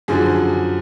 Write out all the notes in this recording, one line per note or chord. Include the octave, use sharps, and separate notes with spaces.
F#2 D3 F3 G#4